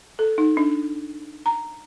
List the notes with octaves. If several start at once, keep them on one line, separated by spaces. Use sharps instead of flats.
A4
D#4
D4
A#5